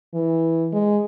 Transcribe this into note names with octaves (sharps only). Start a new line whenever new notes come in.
E3
G#3